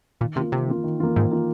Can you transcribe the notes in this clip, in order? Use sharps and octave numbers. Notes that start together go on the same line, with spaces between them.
A#2 D#3
C3 A#3 F4
C3 D#3
A#3 F4
D#3
A#3 F4
G#2 D#3
A#3 F4